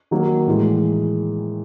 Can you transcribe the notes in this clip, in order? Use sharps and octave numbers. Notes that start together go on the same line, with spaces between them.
D#3 F#3 A#3
A2 E3 G#3